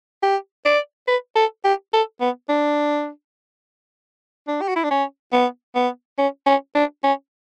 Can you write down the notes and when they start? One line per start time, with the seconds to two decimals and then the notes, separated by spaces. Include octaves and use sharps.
0.23 G4
0.66 D5
1.08 B4
1.36 A4
1.64 G4
1.93 A4
2.21 B3
2.49 D4
4.48 D4
4.61 G4
4.68 F#4
4.76 E4
4.84 D4
4.91 C#4
5.33 B3
5.75 B3
6.18 C#4
6.46 C#4
6.75 D4
7.04 C#4